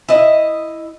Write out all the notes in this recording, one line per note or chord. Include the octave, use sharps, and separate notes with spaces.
E4 D#5